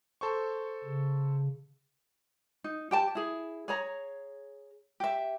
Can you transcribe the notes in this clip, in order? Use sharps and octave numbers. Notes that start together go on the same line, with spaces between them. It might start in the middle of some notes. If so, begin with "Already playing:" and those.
A4 C5 C#6
C#3
D#4
G4 G5 A5
E4 G#4
G#4 C#5 A#5
G4 E5